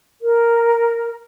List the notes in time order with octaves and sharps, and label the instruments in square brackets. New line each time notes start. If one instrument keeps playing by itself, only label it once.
[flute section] A#4